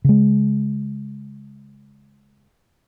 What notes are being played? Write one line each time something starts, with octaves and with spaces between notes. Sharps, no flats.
C#3 G#3